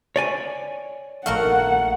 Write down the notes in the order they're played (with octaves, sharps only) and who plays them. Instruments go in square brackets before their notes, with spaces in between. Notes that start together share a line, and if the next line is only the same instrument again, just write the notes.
[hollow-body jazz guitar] C#5 D5 G#5
[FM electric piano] A#1 F5 [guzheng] A3 F#4 A#4 [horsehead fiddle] F#5